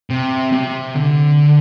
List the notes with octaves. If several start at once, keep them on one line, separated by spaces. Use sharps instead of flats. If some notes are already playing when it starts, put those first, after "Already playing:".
C3
C3
D3